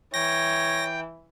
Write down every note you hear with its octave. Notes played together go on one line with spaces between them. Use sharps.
E3 C#5 G5 A#6